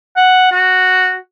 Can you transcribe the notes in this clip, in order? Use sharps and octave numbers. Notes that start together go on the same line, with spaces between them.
F#5
F#4